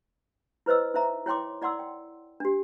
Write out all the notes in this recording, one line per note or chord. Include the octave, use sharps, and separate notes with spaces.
E4 B4 C5 D#5 E6
D#4 C5 E5 A#5
E4 C#5 G5 C6 D6
E4 D5 F#5 C6 E6
G5
D4 G4